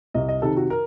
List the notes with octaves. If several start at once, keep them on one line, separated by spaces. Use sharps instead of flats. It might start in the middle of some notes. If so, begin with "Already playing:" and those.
C2 D#5
D#5
C3 D#3 A4
F#4
A#4